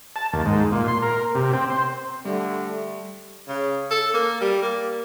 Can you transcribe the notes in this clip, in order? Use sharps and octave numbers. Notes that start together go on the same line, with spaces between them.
A5
D#2
G#2
A#2
C6
A#4
C3
C4
C5
D3 G3 A3
C#3
A4
A#3
G3
A#3